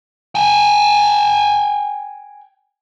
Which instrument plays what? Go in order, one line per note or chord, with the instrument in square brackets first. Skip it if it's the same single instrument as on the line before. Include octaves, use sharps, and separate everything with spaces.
[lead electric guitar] G5 G#5